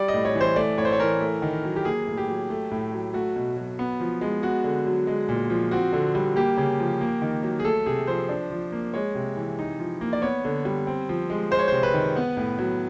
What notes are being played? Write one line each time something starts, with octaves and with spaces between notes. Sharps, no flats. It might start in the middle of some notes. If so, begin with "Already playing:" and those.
Already playing: G3 D5
D#5
A2
C#5
E3
C5
A3 D5
A2 C#5
C5
C#5
E3 A#4
A3
D#3
F#3
G4
A#3 G#4
A2
G4
F#3
A3
A2
F#3
A3 F#4
B2
F#3
B3
F3
G#3
B3 F#4
D3
F#3
G#3
A#2
F3
C4 F#4
D3
G3
A#3 G4
C#3
F3
A#3
D#3
F#3
G#4
A3 A4
C3 G#4
F3 C5
D4
F3
A#3
G#3 C#5
C3
E3
D#4
F3
A#3
D5
B3 C#5
D3
G3
C4
F3
G#3
G#3 C5
C#5
C3 C5
B4
D#3
B3
A2
F#3